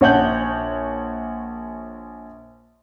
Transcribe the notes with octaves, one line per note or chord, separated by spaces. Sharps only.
A#1 C#5 F#5 A5 G6 F#7